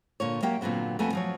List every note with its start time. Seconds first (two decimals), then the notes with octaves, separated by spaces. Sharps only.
0.20 A#2 D3 C#5
0.42 F#3 A#3 G4 E5 G5
0.61 A#2 D3 F#3 B3 C4
0.99 F2 A3 B3 G#5 A5
1.13 F3 F#3 C#5